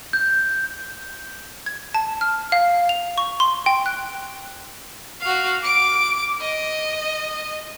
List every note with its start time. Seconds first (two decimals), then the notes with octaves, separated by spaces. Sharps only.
0.13 G6
1.66 G#6
1.95 A5
2.21 F6
2.52 F5
2.89 F7
3.18 C#6
3.40 C6
3.66 G5
3.86 F#6
5.21 F#4 F5
5.63 D6 D7
6.40 D#5